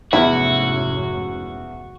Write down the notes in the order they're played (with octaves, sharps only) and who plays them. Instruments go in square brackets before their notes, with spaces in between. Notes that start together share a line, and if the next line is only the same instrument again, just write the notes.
[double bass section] F1 G#2 C#4 [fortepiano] E2 [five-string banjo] E4 [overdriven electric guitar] F#4